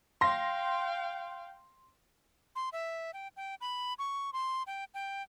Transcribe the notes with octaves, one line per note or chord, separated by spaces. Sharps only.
F5 G5 C6 A#6
C6
E5
G5
G5
B5
C#6
C6
G5
G5